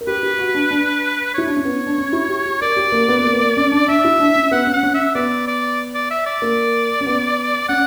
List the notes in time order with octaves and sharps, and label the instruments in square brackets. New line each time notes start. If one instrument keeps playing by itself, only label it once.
[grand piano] A#4
[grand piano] G4 [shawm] B4
[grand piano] G4
F#4
D4
D4
[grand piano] E4 [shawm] C#5
[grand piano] D4
C#4
B3
D4
C#4
E4
G4
G4
[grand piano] A#4 [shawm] D5
[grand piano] G4
A#3
B3
B3
A#3
B3
A#3
C#4
D4
[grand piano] D4 [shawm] E5
[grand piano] E4
D4
C#4
[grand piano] B3 [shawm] F#5
[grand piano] C#4
[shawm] F#5
[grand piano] C#4
[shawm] E5
[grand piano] B3 [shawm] D5
[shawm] D5
D5
E5
D5
[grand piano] A#3
C#4
B3
[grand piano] C#4 [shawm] F#5